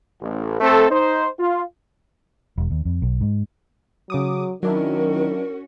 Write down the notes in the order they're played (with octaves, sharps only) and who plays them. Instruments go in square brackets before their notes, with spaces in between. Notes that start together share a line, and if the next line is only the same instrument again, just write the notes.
[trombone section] A1
A3 C4 A4
D#4 C5
F4
[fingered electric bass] E1
D#2
F2
B1
G#2
[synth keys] C#3 D6 D#6 [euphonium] F#3
[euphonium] D#3 [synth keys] F#3 D4 E4 [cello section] C#4 F#4 [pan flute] A#4